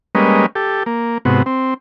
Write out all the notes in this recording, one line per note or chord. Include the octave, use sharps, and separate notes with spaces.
G3 G#3 A#3 C#4 B4 D#5
G4 A4
A#3
G#2 C3 B3 F#4
C4